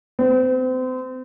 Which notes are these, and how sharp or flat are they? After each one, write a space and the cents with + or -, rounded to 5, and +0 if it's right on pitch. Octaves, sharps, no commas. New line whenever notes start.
C4 -35